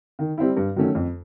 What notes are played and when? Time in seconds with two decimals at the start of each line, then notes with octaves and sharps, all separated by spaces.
0.19 D#3
0.38 G3 C4 E4
0.57 G2
0.76 D#3 F#3 A3 C#4
0.95 F2